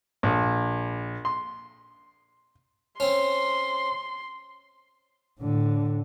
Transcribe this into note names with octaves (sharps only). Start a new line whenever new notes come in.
A#1
C6
C4 C#4 C6
A2 D3